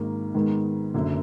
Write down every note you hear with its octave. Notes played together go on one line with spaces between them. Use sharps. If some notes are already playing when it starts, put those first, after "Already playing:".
Already playing: G#1 G#2 D#3 A#3
G#2 D#3 G#3 B3
F#1 F#2 D3